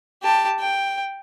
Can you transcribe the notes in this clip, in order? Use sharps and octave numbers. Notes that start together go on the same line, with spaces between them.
G4 A5
G5